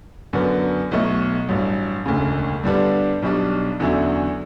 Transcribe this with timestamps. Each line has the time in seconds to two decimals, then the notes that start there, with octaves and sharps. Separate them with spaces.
0.33 F#2 D3 F#3 B3
0.91 B1 B2 A3
1.48 A1 G2 F#3
2.06 E1 D2 C#3
2.63 G2 D3 G3 B3 D4
3.22 B1 B2 G3 D4
3.80 E2 D3 F#3 C#4 E4